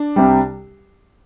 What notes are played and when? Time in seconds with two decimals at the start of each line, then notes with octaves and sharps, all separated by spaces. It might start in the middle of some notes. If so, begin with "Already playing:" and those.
Already playing: D4
0.16 C2 C3 G3